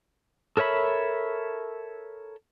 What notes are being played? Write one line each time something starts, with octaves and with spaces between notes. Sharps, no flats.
A4 A#4 C#5 E5 B5